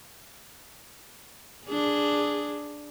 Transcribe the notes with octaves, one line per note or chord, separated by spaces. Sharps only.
D4 G#4